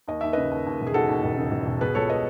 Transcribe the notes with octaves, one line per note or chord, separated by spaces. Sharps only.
D#2 D#5
D#2 E5
C#3 B4 D#5
D#2
D#2
E1
G#4
D#2 F#4 A4
D#2
E1
C#3
E1
E1
B2 G#4 B4
C#2 A4 C#5
B4 D#5